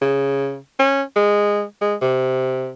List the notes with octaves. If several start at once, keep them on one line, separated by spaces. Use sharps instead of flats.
C#3
C#4
G#3
G#3
C3